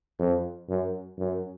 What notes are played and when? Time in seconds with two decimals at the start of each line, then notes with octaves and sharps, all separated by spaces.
0.19 F2
0.69 F#2
1.18 F#2